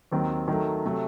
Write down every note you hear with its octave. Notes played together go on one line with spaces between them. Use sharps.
D#2 D#3 F#3 C4
D#3 F#3 A3
C3 F#3 A3